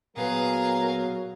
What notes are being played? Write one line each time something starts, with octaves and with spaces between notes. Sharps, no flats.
A#2 F#3 B3 G#4 A#4 B4 F5